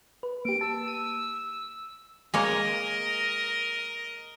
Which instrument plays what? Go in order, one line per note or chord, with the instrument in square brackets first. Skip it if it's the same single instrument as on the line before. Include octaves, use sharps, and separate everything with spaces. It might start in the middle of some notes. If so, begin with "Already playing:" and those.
[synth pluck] B4
[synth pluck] A#3 G4 [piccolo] D7
[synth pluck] A5 [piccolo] E6
[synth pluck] D#7
[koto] G#3 A#3 C#5 [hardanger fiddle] A#4 D#5